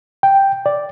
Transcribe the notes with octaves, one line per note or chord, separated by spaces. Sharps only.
G5
D5